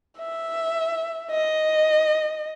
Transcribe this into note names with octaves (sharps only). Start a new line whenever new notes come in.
E5
D#5